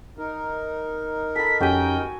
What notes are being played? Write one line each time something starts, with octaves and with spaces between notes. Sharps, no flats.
D#4 A#4
A4 B5 B6
F2 C#4 F#4 G4 G5 G#5